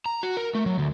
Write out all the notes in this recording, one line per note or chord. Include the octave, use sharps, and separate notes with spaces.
A#5
F#4
A#4
A3
F#3
D2